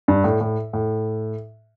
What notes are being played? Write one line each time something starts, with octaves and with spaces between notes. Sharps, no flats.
G2
A2
A2
A2